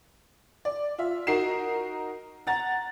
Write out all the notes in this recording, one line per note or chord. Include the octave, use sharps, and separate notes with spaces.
D5
F4 E5
D#4 F#4 A#4 C7 E7
F#5 A#5 A6